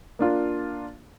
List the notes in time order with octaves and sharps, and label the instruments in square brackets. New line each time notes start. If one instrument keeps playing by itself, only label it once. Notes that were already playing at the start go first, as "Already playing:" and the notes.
[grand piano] A#3 D4 F4